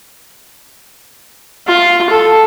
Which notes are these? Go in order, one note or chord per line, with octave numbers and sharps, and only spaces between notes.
F4
A4